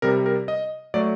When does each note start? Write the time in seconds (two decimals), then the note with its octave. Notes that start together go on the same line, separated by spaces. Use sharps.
0.02 C3 G3 A#4
0.26 A#4
0.48 D#5
0.94 F#3 A3 D5